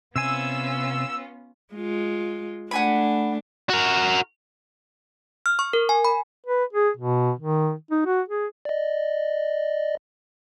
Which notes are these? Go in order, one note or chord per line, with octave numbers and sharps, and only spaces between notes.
C3 B3 C#4 F4 C5 G#5 E6
G#3 F4
A3 D4 F#5 G#5 B5
F#4 A#4
F6
C#6
A#4
G#5
B5
B4
G#4
B2
D#3
D#4
F#4
G#4
D5 D#5